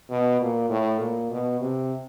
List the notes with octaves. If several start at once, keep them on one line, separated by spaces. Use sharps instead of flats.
B2
A#2
A2
A#2
B2
C3